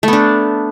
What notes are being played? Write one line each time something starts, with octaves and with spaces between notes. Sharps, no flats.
A3 B3 D4